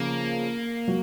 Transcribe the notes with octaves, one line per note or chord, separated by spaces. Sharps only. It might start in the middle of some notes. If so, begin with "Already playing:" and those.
Already playing: C#3 F3 A#3
F#3